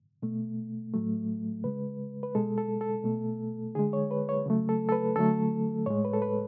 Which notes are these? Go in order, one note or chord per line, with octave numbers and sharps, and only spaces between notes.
B2 A3
A2 F#3 A3
C#3 G#3 B4
B4
B2 G#3 A4
A4
A4
B2 A3
D3 G#3 G#4
C#5
B4
C#5
C#3 F#3 A3
A4
A4
B4
D3 F#3 A3 A4
A2 G#3 C#5
B4
A4
B4